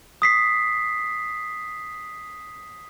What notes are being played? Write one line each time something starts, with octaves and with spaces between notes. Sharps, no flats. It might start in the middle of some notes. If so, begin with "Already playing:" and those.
D#6 B6 C7